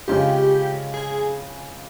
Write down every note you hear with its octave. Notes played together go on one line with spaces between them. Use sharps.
C#3 G#3 C4 F4 G4
G#4